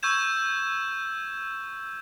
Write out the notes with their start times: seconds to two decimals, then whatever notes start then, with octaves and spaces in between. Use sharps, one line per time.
0.03 C#6 E6 G6 G#6 E7